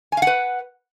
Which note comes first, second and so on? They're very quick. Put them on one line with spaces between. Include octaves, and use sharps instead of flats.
G#5 F5 F#5 B4